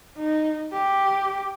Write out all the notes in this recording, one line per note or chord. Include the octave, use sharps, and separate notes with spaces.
D#4
G4